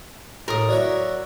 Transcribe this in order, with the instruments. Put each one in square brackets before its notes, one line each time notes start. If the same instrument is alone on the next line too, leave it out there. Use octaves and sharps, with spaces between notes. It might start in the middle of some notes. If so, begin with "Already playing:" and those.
[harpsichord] A2 [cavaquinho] A#4 D#6
[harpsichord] F#3 F#4 E5 [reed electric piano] D5